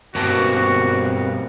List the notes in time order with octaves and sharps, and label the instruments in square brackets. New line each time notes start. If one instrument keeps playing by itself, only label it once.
[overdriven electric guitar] G2 B2 [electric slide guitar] A#3 C4 A5 [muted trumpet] F#4